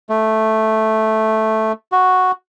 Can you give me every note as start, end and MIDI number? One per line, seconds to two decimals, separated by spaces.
0.10 1.72 57
1.92 2.32 66